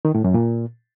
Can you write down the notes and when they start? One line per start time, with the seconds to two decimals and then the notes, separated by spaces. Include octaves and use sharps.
0.05 D#3
0.15 A2
0.24 F#2
0.34 A#2